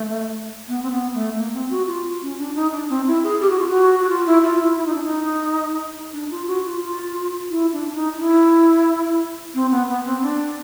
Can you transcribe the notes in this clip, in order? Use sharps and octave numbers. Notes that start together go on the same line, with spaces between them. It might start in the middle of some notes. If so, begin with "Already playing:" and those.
Already playing: A3
B3
C4
B3
A3
A#3
C4
F#4
F4
C#4
D4
D#4
D4
C4
E4
G#4
G4
F#4
F4
F#4
F#4
F4
E4
F4
E4
E4
D#4
D4
D#4
D4
F4
F#4
F4
F4
E4
D4
D4
D#4
D#4
E4
C4
B3
B3
C4
D4